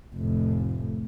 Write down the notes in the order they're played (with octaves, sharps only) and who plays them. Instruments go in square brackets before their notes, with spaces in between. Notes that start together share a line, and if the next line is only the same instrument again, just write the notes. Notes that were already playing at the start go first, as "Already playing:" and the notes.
[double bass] F1 A2